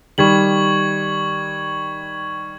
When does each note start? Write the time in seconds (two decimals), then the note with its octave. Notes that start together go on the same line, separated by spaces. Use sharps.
0.18 D#3 G3 C#6 G#6 F#7